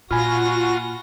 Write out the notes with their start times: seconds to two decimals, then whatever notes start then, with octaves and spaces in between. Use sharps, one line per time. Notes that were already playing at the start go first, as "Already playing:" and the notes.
0.11 A#2 F4 F#4 G#5 B5 F6 A#6